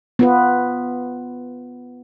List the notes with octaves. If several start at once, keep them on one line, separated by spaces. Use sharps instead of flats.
B3 F4 B4